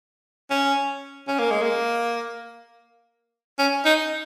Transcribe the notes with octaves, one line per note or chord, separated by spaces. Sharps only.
C#4
C#4
A#3
G#3
A#3
C#4
D#4